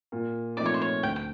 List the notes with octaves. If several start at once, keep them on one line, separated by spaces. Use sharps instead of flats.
A#2
F3 A3 C4 D#4 D5
C#5
C5
C#5
D2 G5
G5